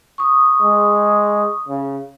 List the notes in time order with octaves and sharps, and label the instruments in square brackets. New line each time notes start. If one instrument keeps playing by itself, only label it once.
[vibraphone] C#6 D#6
[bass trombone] G#3
C#3